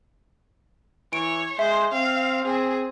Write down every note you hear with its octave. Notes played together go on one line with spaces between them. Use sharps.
E3 C#5 D7
G#3 C5 E5
C4 F5
C4 G#4